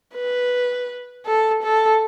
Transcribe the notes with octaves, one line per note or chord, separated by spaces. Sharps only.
B4
A4
A4